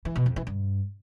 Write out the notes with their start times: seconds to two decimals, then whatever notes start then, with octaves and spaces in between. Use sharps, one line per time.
0.05 E3
0.16 B2
0.26 F2
0.36 E3
0.47 G2